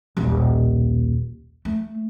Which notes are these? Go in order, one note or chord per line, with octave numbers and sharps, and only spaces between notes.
D#1 B1
A3